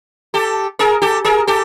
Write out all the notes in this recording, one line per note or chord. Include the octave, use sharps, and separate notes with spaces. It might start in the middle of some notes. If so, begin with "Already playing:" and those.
G4 A4
G#4 A#4
G4 A4
G#4 A#4
G4 A4